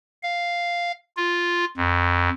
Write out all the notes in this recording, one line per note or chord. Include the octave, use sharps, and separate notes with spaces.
F5
F4
F2